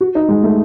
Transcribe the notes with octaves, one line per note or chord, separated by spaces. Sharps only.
F#4
D#4
G#3
A3